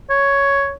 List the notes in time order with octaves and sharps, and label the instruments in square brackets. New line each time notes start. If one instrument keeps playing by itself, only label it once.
[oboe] C#5